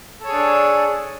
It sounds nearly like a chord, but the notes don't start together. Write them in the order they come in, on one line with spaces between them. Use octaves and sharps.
A4 C#5 G#4 D4